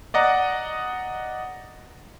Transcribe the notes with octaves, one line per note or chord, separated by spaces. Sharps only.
D5 D#5 F#5 A#5